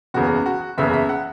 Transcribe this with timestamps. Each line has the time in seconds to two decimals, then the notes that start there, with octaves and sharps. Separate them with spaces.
0.14 F#1 E2 C#3 F#4
0.46 F#4
0.78 F#1 E2 C#3 E5
0.93 E5
1.09 F#5